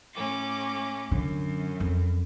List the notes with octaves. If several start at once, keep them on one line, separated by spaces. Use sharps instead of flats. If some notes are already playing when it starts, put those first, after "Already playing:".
A2 C#4 D6
F#2 D3
F2